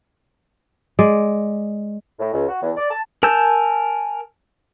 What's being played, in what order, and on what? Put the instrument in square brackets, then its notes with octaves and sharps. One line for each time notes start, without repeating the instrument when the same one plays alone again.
[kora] G#3 D5
[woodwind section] A2
C#2
F#4
E2
D5
A5
[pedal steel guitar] A#4 G#5 A5 E6 G6